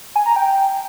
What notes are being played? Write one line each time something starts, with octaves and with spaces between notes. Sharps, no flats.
G#5
A#5
G5